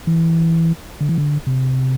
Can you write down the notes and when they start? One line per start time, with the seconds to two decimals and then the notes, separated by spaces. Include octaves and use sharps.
0.07 E3
1.00 D3
1.09 E3
1.18 D3
1.47 C3